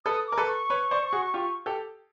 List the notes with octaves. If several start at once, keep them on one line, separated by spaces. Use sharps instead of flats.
A4 B4 D#6
A#4 D6
A4 B4
C#6
B4 C#5
C5 D5
F#4 G#4
F4 G4
G4 A4